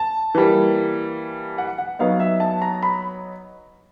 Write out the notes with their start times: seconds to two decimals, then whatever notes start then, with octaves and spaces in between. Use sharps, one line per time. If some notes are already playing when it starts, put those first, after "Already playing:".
Already playing: A5
0.35 E3 G3 A#3
1.58 F#5
1.78 F#5
1.99 F#3 B3 D#4 F5
2.20 E5
2.40 A5
2.62 A#5
2.82 B5